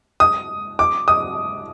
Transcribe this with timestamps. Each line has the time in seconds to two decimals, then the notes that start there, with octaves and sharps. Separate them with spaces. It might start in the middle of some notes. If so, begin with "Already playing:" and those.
0.20 D#6
0.79 D6
1.08 D#6